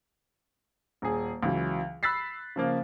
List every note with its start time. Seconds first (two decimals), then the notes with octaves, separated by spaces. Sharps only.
1.02 D#1 G#4
1.43 C#2 E3 F#3
2.03 B5 E6 F#6 A6 B6 C7
2.56 C#3 F3 A#3